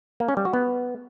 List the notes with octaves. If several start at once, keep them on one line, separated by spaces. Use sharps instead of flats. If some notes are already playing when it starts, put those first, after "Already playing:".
A#3
C#4
G3
F#4
B3